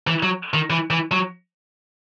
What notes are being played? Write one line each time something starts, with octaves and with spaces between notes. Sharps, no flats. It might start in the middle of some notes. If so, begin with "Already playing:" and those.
E3
F#3
D#3
E3
E3
F#3